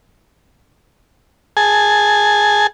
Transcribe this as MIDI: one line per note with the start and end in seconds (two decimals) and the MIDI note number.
1.57 2.67 68
1.57 2.67 80
1.57 2.67 81